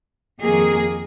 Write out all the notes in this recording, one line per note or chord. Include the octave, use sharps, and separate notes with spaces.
F2 D#3 A#3 G#4